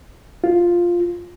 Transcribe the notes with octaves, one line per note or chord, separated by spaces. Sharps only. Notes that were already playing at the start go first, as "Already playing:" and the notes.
F4